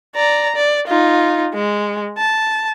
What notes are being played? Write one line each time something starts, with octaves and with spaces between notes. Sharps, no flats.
D5 A#5
D5
D#4 F4
G#3
A5